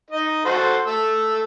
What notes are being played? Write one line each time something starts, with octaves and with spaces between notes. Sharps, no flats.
D#4 D#5
F#4 A4 C5
A3 E6